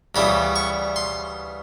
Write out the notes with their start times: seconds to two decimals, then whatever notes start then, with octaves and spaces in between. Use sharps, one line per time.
0.15 D2 C#3 E3 G3 B3 B5
0.56 C#6
0.96 C6